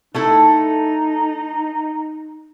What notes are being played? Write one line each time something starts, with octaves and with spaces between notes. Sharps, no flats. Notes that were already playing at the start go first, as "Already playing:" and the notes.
A3 D#4 E4 A4